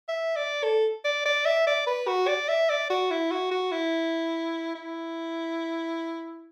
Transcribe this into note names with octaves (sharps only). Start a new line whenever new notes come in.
E5
D5
A4
D5
D5
E5
D5
B4
F#4
D5
E5
D5
F#4
E4
F#4
F#4
E4
E4